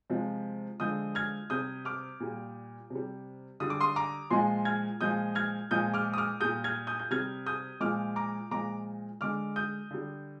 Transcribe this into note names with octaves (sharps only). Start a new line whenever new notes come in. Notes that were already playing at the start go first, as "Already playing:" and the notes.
C3 F3 G#3
D3 F3 G#3 D#6 G6
F6 G#6
C3 G3 D#6 G6
D6 F6
A#2 G3
C3 G3
D3 G3 D#6
D6
C6 D#6
A#5 D6
A#2 F3 G#3 G#5 C6
F6 G#6
A#2 F3 G#3 D#6 G6
F6 G#6
A#2 F3 G#3 D#6 G6
D6 F6
D#6
D6 F6
A#2 G3 D#6 G6
F6 G#6
D#6 G6
G6
C3 G3 F6 G#6
D#6 G6
A#2 F3 G#3 D6 F6
A#5 D6
A#2 F3 G#3 A#5 D6
D3 G#3 D6 F6
D#6 G6
D3 G3